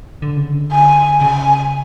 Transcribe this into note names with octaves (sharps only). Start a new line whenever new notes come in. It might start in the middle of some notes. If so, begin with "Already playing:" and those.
D3
C#3
D3
G#5
C#3 G#5